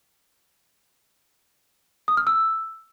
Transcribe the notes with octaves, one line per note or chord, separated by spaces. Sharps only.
D#6
F6
E6